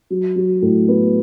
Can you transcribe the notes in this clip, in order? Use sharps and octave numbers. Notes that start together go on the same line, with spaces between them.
F#3
F#3
A2
B3